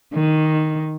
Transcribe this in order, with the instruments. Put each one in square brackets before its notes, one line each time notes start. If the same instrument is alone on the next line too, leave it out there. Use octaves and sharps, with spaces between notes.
[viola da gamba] D#3